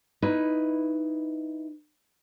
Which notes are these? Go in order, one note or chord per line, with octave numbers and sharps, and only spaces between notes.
D#4 E4 B4